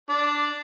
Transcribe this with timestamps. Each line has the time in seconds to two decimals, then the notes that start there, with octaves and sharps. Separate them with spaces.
0.10 D4